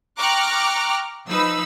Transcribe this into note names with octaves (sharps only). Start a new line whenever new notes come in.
G5 A#5 C#6 D6 F6 F#6
F3 D#4 B4 E6